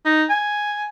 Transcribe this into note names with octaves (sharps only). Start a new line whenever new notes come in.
D#4
G#5